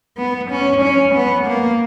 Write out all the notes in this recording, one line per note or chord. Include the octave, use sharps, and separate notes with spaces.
B3
C#4
C#4
B3
A#3